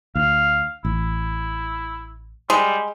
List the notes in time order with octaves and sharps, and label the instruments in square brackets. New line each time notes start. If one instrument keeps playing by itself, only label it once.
[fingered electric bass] D2 [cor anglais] F5
[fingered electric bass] A1 [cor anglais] E4
[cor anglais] G3 [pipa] G#3